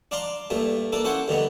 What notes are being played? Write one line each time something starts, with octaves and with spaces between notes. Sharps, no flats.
D4 D5 F5 A#5 C6
G2 A#2 A3
A#3 D4 A4
C#4 E4 A4 C5 F#5
G2 D3 D#3 B3